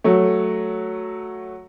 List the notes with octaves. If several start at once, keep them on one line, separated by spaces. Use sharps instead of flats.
F#3 A3